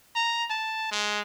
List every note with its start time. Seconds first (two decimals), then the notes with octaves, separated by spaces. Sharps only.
0.15 A#5
0.50 A5
0.92 G#3